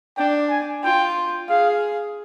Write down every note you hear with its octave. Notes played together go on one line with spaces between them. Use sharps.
D4 G5
G#5
F4 G5
G#4 F5